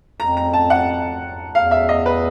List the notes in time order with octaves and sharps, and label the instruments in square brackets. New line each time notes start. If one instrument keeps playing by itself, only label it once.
[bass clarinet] F2 [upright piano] A#5
[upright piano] A#5
A5
F#5
[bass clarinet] E2 [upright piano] F5
[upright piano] E5
D#5
B4